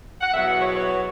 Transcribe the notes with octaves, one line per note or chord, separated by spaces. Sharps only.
F#5
E2 B2 F#3 B3 E5
F#5
C#5
C#5